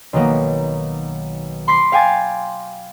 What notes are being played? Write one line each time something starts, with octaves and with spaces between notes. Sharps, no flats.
B1 D#3 F#3 A#3 B3
B5 C6 D6 B6 C7
F5 G5 G#5 D6 A6